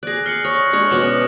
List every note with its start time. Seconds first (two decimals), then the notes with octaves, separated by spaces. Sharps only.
0.03 G#4 D5 F#6 A#6
0.26 C6 F6 C#7 F#7
0.45 C#5 D#6
0.73 G#3 D4 C#5
0.91 B2 C#4 F#5 D6 C#7 F#7